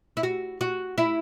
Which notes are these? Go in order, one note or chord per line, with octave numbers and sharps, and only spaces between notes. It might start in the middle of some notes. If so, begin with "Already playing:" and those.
E4
F#4
F#4
E4